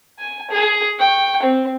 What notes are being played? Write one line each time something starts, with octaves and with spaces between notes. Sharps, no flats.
G#5
G#4
G5 C#6
C4